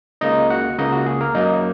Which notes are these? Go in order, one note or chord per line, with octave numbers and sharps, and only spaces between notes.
C#2 C#3 A#3 D#4 D#5
F#4 F#5
C#2 C#3 A#3 D#4 D#5
F#4
G#4
A#3 A#4
F#2 F#3 A#3 D#4 D#5